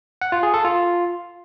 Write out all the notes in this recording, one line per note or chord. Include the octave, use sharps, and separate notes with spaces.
F#5
F4
G#4
A4
F4